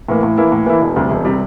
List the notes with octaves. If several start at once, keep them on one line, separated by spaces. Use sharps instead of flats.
A2 E3 A#3
A2
E3 A#3 E4
A2
E3 A#3 E4
E1
D2 C3 G3
E1
C3 G3